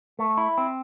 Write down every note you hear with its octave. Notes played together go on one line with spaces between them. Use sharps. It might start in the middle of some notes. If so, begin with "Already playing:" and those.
A3
E4
C4